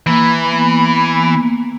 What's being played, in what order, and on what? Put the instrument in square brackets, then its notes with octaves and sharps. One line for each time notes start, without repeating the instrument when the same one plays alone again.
[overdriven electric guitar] E3 [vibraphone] A#3
[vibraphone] B3
B3
B3
A#3